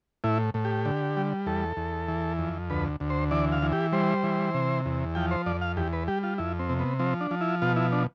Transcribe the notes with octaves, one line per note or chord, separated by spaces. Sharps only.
A2 E4
A2
G4
D3
G3
E2 A4
E2
E3
F2
D2 B4
D2
C5
E3 D5
F5
E3
G4
G3 C5
E3
C3
E2
F3 G5
C5
F2 D5
F5
E2 G4
B4
G3 G4
F4
F2 E4
C4
C3
B3
F3 C4
D4
F3
E4
B2 F4
E4
D4